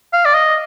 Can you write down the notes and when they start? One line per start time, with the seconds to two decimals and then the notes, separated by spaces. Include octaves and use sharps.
0.13 F5
0.25 D5
0.34 D#5